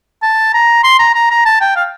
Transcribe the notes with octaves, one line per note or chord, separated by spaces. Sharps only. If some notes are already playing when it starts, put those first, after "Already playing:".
A5
A#5
C6
A#5
A#5
A#5
A5
G5
F5